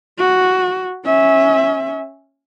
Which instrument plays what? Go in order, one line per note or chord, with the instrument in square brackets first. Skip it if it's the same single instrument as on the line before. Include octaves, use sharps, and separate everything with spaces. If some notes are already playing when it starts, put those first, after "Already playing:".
[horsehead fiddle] F#4
C#4 E5